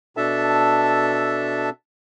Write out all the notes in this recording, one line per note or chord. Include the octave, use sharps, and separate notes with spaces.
B2 D4 A4 E5 A5